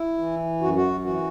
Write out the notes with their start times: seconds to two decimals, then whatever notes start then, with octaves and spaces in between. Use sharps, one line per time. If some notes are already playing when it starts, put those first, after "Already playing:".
Already playing: E4
0.18 E3
0.61 F#2 F#4
0.76 F#4
1.05 E3 F#4